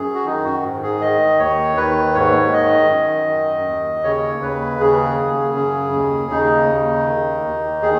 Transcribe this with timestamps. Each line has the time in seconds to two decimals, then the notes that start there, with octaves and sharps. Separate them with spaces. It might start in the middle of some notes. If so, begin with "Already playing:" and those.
Already playing: F#2 G#4
0.14 F#4
0.25 D#3 D#4
0.45 F#4
0.63 G#2
0.83 G#4
1.01 D#3 D#5
1.39 D#2 C#5
1.77 D#3 B4
2.15 G#2 C#5
2.53 D#3 D#5
2.90 F#2
3.28 D#3
3.66 D#2
4.04 C#3 C#5
4.42 D#2 B4
4.80 C#3 G#4
5.18 F#2
5.55 C#3
5.93 D#2
6.31 C#3 D#4
6.69 D#2
7.06 D#3
7.44 D#2
7.82 D#3 G#4